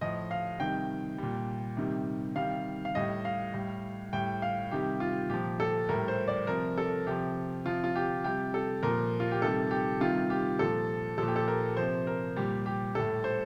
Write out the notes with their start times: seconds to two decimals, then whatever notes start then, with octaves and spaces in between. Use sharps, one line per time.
0.01 A2 F3 D#5
0.31 F5
0.60 C3 D#3 G3 G5
1.18 A#2 G3
1.77 C3 D#3 G3
2.36 C3 D#3 G3 F5
2.85 F5
2.95 A2 G3 D#5
3.25 F5
3.54 A2 G3
4.13 A2 G3 G5
4.42 F5
4.71 C3 D#3 G3 G4
5.00 F4
5.30 A#2 F3 G4
5.60 A4
5.89 A2 G3 A#4
6.08 C5
6.28 D5
6.47 C3 F3 A#4
6.78 A4
7.07 C3 F3 G4
7.66 C3 F3 F4
7.84 F4
7.96 G4
8.24 C3 G3 G4
8.54 A4
8.83 A#2 F3 A#4
9.20 F4
9.31 G4
9.42 C3 D#3 G3 A4
9.71 G4
10.00 C3 D#3 G3 F4
10.30 G4
10.59 A#2 F3 A4
11.18 A#2 F3 A4
11.28 G4
11.36 A4
11.48 A#4
11.77 C3 F3 C5
12.07 A#4
12.36 A#2 G3 G4
12.66 G4
12.95 A2 G3 A4
13.24 C5